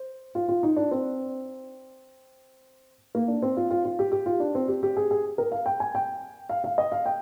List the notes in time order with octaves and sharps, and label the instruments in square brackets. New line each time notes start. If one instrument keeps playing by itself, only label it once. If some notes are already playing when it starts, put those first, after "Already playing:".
Already playing: [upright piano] C5
F4
F4
D#4
D4
C4
A#3
D4
C4
F4
F4
F4
G4
G4
F4
D4
C4
G4
G4
G#4
G#4
A#4
F5
G5
G#5
G5
F5
F5
D#5
F5
G5